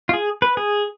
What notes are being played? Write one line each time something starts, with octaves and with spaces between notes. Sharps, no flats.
F4
G#4
B4
G#4